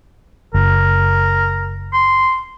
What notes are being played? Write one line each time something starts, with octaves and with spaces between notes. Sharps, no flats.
F#1 A#4
C6